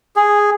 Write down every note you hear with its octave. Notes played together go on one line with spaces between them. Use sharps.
G#4